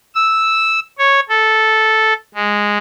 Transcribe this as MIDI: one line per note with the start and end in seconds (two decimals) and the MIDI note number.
0.15 0.80 88
0.99 1.20 73
1.29 2.13 69
2.35 2.78 56